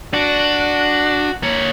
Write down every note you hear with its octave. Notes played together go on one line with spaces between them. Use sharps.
D4 F#4
A#3 C#5